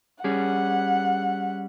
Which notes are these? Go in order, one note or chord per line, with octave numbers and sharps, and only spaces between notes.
G3 C#4 G#4 F#5